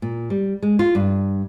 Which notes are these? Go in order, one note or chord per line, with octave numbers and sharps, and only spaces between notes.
A#2
G3
G#3
F4
G2